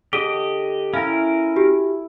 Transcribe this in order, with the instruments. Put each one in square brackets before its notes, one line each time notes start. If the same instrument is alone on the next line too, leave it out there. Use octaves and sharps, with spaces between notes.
[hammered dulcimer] D3 [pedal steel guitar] G4 D#5 [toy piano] G#4 [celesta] G7
[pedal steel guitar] C#4 A#4 [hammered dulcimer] E4 G#5 [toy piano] F5
[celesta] F#4 G4